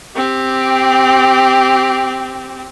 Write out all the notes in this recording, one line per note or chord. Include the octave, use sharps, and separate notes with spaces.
C4 G4